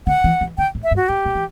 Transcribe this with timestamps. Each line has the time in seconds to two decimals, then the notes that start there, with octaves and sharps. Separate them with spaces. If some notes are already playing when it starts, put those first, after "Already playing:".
0.07 D3 F#5
0.24 E3
0.41 E3
0.58 D3 G5
0.75 A2
0.83 E5
0.91 G2
0.96 F#4
1.09 A2 G4
1.26 B2
1.35 E3